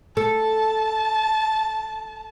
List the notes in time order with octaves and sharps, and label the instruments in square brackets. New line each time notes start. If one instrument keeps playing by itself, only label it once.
[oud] A4 [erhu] A5